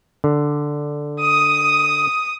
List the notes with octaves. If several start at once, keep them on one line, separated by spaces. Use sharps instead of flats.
D3
D#6